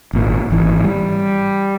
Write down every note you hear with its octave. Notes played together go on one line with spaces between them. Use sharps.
G#1 A#2
G#1 E3
G3